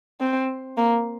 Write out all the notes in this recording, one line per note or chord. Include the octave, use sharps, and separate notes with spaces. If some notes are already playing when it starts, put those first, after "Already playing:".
C4
A#3